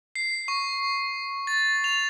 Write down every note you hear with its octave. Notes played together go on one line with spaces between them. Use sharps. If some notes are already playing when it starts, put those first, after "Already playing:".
C7
C#6
A6
F7